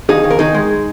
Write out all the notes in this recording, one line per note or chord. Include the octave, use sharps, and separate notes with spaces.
D#2 D#4 G#4
D#2
A#4
D#3 D#4 G#4
G#3